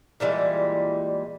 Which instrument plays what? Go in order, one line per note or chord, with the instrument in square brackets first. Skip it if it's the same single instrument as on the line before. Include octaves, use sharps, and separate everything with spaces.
[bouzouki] A#2 E3 G3 G#3